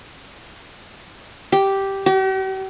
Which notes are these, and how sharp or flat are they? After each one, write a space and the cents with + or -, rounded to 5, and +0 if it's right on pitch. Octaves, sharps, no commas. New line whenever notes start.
G4 -5
G4 -45